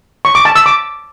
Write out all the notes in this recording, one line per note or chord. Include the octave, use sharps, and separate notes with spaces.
C#6
D6
A5
E6
D6